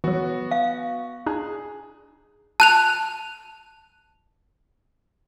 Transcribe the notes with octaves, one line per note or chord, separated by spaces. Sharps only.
E3 F#3 B3 F#4
F5
D4 D#4 G#4
A5 F#6 F7